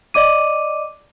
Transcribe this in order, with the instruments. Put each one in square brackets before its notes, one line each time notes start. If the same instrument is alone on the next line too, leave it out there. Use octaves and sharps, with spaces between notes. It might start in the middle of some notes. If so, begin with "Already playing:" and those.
[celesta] D5 D#5 D6 D#7